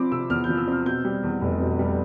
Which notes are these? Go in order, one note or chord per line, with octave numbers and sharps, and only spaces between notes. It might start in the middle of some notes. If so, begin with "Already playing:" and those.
Already playing: F3 C4 B5 D6
C3 E6
E2 F6
G6
F3
E6
C4 F6
B2 G6
G3
E2
F1
B2
G3